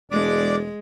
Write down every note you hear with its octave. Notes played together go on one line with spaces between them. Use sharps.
E1 G#3 D4 D5 D6